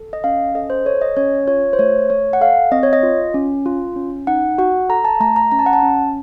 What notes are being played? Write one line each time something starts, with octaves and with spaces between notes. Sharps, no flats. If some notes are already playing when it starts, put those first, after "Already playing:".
Already playing: A4
D#5
C#4 F5
A4 D#5
C5
A4 C#5
D#5
C#4 C#5
F4 C#5
C5
A3 C#5
A3 C#5
F#5
A4 F5
C4 D#5
C#5
D#5
F4
C#4
F4
C#4
D#4 F#5
F#4 F#5
A4 A#5
A5
A3 A#5
A#5
C#4 A#5
A5
F#5
A5
C#4